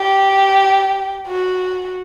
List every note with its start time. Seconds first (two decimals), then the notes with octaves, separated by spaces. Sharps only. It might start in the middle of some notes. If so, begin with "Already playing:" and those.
Already playing: G4
1.27 F#4